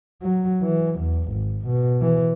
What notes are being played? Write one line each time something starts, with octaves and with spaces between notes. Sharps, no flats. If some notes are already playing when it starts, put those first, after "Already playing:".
F#3
E3
E2
G#1
B2
E3